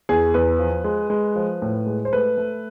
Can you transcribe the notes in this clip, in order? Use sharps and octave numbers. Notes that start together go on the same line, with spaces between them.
E2 G#4
E2 B4
F3
G#3
G#3
F3
A2
G#3
C5
A3 B4
A3